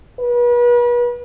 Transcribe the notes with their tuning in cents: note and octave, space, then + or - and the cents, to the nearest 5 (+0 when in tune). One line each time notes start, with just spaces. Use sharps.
B4 -40